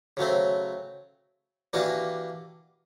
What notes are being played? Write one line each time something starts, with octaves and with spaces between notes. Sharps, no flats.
C#3 F#3 A3 C4
E3 G3 A#3 D4 F#4